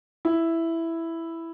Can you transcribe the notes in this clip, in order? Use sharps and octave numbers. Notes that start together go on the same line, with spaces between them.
E4